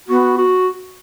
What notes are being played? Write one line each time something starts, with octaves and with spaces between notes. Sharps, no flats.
B3 F#4
F#4